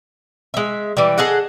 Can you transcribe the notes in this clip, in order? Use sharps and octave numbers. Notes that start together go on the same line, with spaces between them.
G#3 E5
E3 G3
G#4 A4 D#5 F#5